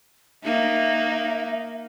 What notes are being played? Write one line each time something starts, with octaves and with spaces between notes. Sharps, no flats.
A#3 D#4 E5